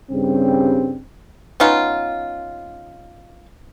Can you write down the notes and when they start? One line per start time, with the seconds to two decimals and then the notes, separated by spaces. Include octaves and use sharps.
0.12 G2 C#3 G3 C4
1.60 B3 C#4 D#4 F4